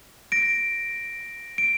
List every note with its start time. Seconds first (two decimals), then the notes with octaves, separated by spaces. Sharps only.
0.32 A#6 D7
1.58 D7